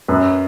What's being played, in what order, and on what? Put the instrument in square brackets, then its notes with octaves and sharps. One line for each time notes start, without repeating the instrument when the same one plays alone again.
[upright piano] F#2 B4